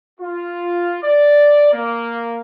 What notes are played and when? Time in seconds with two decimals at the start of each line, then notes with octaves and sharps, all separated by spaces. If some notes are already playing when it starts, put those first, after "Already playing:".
0.20 F4
1.03 D5
1.72 A#3